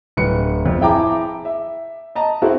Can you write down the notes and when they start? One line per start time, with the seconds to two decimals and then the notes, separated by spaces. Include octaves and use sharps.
0.17 D1 B4 C#7
0.66 F2
0.81 E4 G#4 G5 A5 A#5 D6
1.45 E5
2.15 D#5 A5 A#5
2.42 C4 E4 F#4 A4